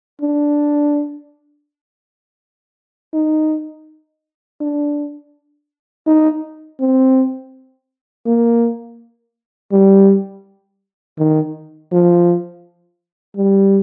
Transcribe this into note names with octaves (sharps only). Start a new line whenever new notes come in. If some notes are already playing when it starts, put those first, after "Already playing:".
D4
D#4
D4
D#4
C4
A#3
G3
D#3
F3
G3